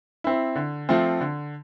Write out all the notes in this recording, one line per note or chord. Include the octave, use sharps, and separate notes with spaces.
C4 E4
D3
F3 A3 C4
D3